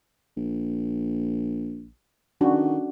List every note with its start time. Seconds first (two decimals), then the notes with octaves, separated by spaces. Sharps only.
0.37 A#1
2.41 D#3 C#4 D4 F#4